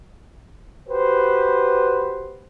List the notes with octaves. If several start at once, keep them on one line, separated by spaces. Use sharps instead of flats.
F#4 G4 B4 C5